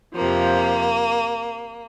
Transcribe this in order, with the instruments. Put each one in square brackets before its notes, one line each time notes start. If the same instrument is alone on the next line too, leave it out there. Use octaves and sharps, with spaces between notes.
[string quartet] F2 C3 F3 A#3